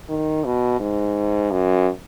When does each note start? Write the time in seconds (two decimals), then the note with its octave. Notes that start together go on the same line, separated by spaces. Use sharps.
0.09 D#3
0.45 B2
0.80 G#2
1.51 F#2